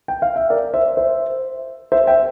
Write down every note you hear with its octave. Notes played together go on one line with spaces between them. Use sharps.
G5
F5
E5
A#4 D5
C5 E5
C5 E5
C5 E5
E5 G5